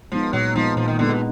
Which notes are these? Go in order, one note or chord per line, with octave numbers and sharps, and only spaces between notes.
F3 G#3 B3 D#4
A#2 F#3
F3 G#3 B3 D#4
A#2 F3
D#3
D3 G#3 B3 D#4
B2